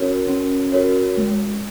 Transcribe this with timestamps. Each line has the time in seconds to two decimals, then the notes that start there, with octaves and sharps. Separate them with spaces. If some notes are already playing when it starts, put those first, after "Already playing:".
Already playing: C#4 F#4 A#4 C#5
0.27 C#4
0.72 F#4 A#4 C#5
1.17 G#3